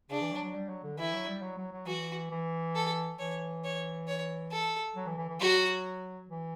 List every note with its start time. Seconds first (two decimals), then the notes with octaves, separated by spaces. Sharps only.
0.10 C#3 D4
0.21 E3
0.32 F#3
0.43 F#3
0.55 G3
0.69 F#3
0.83 D3
0.98 E3 E4
1.13 F#3
1.27 G3
1.42 F#3
1.58 F#3
1.72 F#3
1.86 E3 F#4
2.31 E3
2.75 A4
3.19 E3 C#5
3.64 C#5
4.07 C#5
4.51 A4
4.96 F#3
5.07 E3
5.18 E3
5.30 E3
5.40 F#3 F#4
6.29 E3